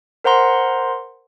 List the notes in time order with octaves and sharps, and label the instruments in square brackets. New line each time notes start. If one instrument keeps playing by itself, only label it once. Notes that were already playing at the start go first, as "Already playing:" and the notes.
[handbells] A#4 C5 F#5 A#5 C6